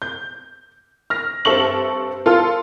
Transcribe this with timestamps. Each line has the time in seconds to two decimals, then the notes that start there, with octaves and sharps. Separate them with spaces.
0.02 G6
1.10 F6 A#6
1.45 G2 C4 A4 E5 C#6 F#7
2.26 F4 A4 A#4 C6 F6